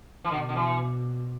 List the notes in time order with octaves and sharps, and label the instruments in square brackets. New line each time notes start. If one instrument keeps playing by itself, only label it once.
[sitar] E3
[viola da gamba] B2 [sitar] D3
[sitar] D3
E3